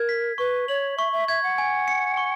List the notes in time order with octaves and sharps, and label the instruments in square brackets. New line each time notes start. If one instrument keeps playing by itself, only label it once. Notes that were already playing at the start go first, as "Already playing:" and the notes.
Already playing: [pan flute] A#4 [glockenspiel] G#6
[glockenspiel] B6
[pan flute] B4 [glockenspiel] C#6
[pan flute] C#5 [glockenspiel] F#7
[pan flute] E5 [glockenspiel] C#6
[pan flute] E5
[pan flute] E5 [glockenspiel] G#6
[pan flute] F#5
[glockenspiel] G#5
C#7
C#6